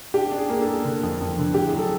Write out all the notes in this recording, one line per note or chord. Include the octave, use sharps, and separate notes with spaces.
D4 G4
D4
G#4
A#3
G#4
A4
A#3
D3
F2
F2
D3
A2 G4
G#4
F#3 A4